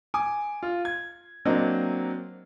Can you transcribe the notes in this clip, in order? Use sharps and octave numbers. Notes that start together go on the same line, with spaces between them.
G#5 D6 D#6
F4
G#6
F#3 A#3 C4 D4 D#5